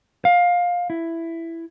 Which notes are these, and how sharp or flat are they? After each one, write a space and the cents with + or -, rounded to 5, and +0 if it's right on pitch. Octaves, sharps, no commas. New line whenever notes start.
F5 +20
E4 +10